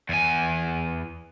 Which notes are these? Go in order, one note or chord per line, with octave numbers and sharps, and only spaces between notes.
E2 G#5